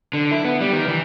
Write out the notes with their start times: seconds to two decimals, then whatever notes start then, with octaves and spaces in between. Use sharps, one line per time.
0.13 D3
0.31 E4
0.45 B3
0.61 G3
0.73 D#3
0.88 E3